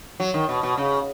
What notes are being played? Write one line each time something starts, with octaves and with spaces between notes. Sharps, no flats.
F#3
D#3
B2
B2
C#3